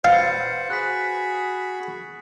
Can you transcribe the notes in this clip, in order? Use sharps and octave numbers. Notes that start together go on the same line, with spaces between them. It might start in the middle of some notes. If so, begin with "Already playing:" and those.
B4 C5 F5 F#5 A6 C7 C#7
F#4 G#4 B5 F#6 B6